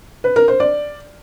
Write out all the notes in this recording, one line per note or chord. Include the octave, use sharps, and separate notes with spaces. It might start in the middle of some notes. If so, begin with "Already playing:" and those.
B4
A#4
C5
D5